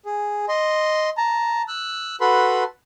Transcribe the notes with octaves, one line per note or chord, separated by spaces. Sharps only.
G#4
D#5 C6
A5 A#5
E6 F#6
F#4 A4 B4 B5 C6